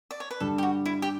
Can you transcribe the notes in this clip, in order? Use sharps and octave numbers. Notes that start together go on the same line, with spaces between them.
D5
C#5
B4
G2 D3 G3 A4
G4
F#4
E4
G4